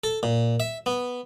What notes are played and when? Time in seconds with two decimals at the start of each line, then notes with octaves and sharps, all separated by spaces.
0.04 A4
0.23 A#2
0.60 E5
0.86 B3